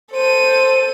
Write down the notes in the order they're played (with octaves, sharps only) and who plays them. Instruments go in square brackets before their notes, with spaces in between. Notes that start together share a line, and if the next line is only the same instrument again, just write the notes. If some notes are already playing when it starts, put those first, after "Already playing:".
[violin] A4 D#7 [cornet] C5